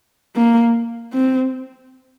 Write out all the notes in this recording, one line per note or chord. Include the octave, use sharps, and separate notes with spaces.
A#3
C4